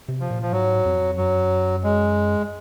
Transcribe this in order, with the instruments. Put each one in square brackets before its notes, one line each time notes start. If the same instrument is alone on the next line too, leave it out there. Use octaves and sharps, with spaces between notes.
[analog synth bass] C3
[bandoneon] F3
[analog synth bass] A#2
[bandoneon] F3
[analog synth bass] G#2 [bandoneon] F#3
[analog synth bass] F2
[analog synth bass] F#2 [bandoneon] F#3
[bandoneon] G#3